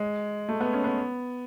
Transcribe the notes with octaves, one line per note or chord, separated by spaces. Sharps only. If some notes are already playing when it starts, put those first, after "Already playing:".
Already playing: G#3
A3
B3
C#4
B3